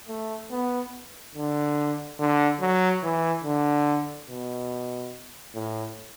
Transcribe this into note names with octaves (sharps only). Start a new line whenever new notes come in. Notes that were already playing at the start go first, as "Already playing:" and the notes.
A3
B3
D3
D3
F#3
E3
D3
B2
A2